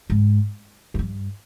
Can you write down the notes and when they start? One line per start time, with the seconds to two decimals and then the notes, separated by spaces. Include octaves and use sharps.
0.10 G#2
0.94 F2
0.99 G2